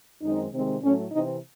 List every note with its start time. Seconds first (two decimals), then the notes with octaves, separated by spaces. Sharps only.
0.22 F#2 D#3 G#3 C4 D#4
0.52 C3 D#3 G#3 C4
0.82 A2 F#3 A3 C#4
1.12 C3 E3 C4 D#4